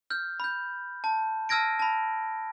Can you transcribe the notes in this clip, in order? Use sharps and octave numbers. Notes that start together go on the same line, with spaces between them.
F6 G6
B5 G6
A5
A5 E6 F6 G#6 A#6 D7
A5 B5